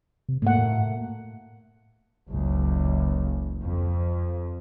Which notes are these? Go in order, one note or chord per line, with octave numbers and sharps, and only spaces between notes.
C3
G#2 A3 A#3 F#5
A2
F#1 C#2
F2